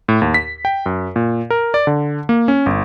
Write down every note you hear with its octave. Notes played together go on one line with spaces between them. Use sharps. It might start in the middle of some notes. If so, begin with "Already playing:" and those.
A2
D#2
B6
G5
F#2
A#2
A#4
D5
D3
A#3
C#4
G1